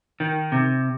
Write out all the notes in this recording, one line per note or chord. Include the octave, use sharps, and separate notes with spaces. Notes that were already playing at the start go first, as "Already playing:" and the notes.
D#3
C3